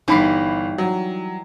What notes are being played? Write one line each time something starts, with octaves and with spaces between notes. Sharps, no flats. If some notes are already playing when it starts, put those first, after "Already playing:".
G1 E3 G3 D#4 A#5 B5 C7
F#3